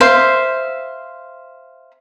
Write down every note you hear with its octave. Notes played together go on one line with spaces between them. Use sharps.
C5 E5 F5